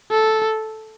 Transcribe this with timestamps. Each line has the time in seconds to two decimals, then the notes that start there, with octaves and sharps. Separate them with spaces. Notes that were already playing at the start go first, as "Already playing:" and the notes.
0.11 A4